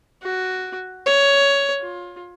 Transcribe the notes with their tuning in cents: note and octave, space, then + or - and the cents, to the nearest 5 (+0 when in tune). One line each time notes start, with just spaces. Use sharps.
F#4 +5
C#5 +10
F4 +25